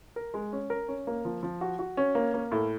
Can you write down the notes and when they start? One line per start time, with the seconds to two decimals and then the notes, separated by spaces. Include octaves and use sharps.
0.16 A#4
0.34 G#3
0.53 C#4
0.70 A#4
0.88 C#4
1.07 A#3
1.25 F3
1.43 F3
1.61 F#4
1.79 F#4
1.97 C#4
2.15 A#3
2.34 A#3
2.52 A2